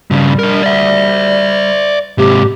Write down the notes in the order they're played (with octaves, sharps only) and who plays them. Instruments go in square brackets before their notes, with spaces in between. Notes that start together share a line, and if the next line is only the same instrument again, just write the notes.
[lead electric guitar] G2 C#3 [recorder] G3
[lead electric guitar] D4 A#4
D5 E5
[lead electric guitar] G#2 C3 [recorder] G4